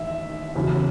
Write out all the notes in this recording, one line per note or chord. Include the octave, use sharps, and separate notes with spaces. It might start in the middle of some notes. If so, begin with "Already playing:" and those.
Already playing: A1 D#3 E5
E2 C#3 F#3